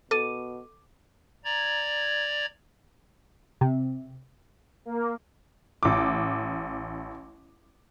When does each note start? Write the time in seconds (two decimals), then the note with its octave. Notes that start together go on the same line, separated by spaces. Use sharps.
0.11 B2 A4 D6 D#7
1.44 D5 A#5 G#6
3.61 C3
4.85 A#3
5.83 A1 D6